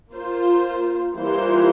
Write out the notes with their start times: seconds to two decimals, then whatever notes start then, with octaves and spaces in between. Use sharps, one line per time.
0.13 A#3 F4 C5
1.18 E3 G3 A#3 F4 C5